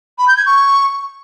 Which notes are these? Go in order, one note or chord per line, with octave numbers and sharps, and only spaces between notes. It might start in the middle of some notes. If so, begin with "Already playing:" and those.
B5
G6
G#6
C#6